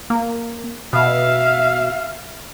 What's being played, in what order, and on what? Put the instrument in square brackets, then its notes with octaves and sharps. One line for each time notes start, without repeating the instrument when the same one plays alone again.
[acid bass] A#3
[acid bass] B2 [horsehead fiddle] E5 F5